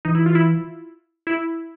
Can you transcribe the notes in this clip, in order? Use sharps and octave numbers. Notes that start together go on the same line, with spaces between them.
E3 D#4
E4
F4
E4
E4